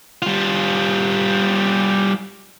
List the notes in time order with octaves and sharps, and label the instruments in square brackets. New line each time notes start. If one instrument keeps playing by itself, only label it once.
[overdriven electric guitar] G3 F4